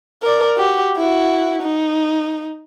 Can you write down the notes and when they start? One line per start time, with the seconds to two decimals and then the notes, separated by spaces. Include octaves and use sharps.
0.22 A#4 D5
0.57 F#4 G4
0.97 E4 F#4
1.62 D#4